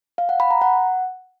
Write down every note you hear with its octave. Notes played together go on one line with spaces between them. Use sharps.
F5
F#5
B5
A#5
F#5